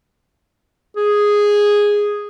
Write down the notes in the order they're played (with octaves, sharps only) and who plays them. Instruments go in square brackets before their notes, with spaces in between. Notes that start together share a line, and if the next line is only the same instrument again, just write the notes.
[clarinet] G#4